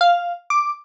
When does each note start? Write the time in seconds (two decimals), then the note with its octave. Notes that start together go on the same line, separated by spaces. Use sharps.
0.01 F5
0.50 D6